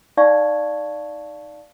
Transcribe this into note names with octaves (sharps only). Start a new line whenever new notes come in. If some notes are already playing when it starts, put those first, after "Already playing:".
D#4 D5 F5 A5 C#6 G#6